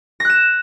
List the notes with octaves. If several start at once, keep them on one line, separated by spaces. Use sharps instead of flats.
F#6 A#6 E7